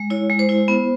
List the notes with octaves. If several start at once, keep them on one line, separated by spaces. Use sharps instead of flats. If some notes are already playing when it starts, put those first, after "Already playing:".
Already playing: G#3
E4 C#5
G#3
C5
E4
B3